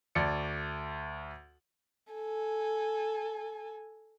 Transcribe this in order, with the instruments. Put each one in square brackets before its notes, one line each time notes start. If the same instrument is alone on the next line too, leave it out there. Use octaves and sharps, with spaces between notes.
[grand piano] D2 D5 C#7
[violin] A4 G#5